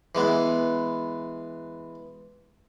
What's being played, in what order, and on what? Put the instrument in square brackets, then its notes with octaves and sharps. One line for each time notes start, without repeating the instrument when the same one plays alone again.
[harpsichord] E3 G#3 B3